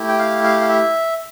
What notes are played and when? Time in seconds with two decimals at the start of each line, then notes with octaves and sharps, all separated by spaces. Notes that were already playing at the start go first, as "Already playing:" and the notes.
Already playing: A3 E4 G4
0.08 G5
0.19 F5
0.44 F5
0.61 F5
0.69 E5